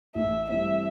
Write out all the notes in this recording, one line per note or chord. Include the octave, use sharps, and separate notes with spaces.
A1 E5
G2 E3 A3 C4 E5